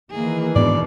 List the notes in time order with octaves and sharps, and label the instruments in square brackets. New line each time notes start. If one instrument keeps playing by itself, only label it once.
[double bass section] D#3 E3 [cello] A#3 G#4
[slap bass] G#2 B3 D4 [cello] B2 [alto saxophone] D5